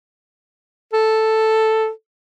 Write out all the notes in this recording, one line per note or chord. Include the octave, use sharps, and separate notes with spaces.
A4